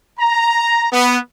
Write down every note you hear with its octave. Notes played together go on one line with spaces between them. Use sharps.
A#5
B3